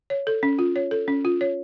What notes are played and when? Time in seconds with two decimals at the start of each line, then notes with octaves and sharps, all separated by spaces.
0.10 C#5
0.27 A4
0.43 C#4
0.59 F4
0.76 C#5
0.91 A4
1.08 C#4
1.25 F4
1.41 C#5